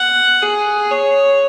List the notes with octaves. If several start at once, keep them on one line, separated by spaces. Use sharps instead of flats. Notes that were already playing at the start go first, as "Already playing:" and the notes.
Already playing: F#5
G#4
C#5